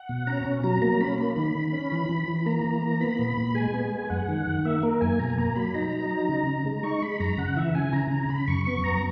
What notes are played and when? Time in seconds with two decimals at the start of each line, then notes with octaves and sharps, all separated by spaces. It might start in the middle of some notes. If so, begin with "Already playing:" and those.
Already playing: F#5
0.09 B2
0.27 C#4 A#5
0.45 B2
0.63 F#3 A#5
0.82 A#3 A#5
1.00 C#4 B5
1.18 A#3 B5
1.36 D#3 B5
1.55 D#3
1.73 C#4
1.92 E3
2.09 E3
2.28 E3
2.46 A#3 A#5
2.64 E3
2.82 A#3
3.01 B3 B5
3.19 A#2
3.37 A#2
3.55 G#3 G#5
3.74 B3
3.92 G#3
4.10 F#2 F#5
4.28 D#3
4.46 D#3
4.65 A#3 E5
4.83 A#3 A#4
5.01 F#2 G#5
5.19 B2 A#5
5.30 G#5
5.37 A#3 A#5
5.55 F#3 B5
5.74 D#4 A#5
5.93 F#3
6.11 D#4
6.29 C#3
6.47 C#3
6.66 G#3
6.83 D#4 C#6
7.02 G#3 B5
7.20 F#2 A#5
7.38 C#3 F#5
7.56 E3 E5
7.75 C#3 G#5
7.93 C#3 A#5
8.11 C#3 A#5
8.29 C#3 B5
8.48 F#2 C#6
8.65 B3 C#6
8.84 F#2 A#5